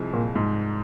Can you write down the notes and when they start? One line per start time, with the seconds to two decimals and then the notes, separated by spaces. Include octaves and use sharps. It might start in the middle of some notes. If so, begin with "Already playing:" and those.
Already playing: C2 C3 F3 G#3
0.13 A#2
0.36 G#2